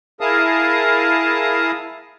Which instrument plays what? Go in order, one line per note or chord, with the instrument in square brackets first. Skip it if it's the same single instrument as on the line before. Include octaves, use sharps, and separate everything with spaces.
[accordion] E4 G#4 A#4 F5 A5 D#6